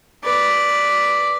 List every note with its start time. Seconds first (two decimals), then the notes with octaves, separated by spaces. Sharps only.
0.23 B4 D5